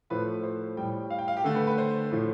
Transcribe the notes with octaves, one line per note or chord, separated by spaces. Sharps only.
A2 F3 A3 B4
C5
A2 G3 G5
F5
G5
F5
G4
D3 A3 A4
B4
B4
C5
A2 F3 A3